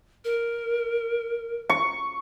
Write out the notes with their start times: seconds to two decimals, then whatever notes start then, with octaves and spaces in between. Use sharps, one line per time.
0.25 A#4
1.70 C#6